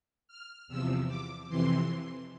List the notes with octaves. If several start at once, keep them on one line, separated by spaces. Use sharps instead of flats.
F6
E2 C3 F3 E6
D6
F2 C3 E3 C6